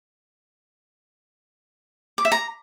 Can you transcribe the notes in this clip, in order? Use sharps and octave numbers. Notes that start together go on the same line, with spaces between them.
D6
E5
A#5